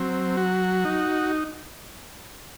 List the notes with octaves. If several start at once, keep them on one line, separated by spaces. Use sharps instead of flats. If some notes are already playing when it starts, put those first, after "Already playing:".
Already playing: F#3 C4
F#4
D#4